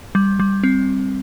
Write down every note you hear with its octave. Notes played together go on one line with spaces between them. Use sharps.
G3
G3
C4